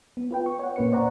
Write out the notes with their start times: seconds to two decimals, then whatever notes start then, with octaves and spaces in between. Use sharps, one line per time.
0.17 B3
0.31 F4 B4 G5
0.46 C#6
0.59 C#5 F#5
0.76 A#2 A#3 C#4 B4 C#5 C#7
0.92 C5 D5 F#5 A#5 C#6